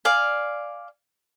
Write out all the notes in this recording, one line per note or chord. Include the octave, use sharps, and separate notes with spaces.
D5 F5 G#5